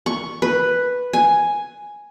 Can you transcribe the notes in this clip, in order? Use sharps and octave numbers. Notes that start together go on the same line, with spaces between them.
C#6
B4
G#5